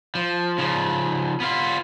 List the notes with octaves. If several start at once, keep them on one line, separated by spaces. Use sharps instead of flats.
F3
C#3 F3
B3 F4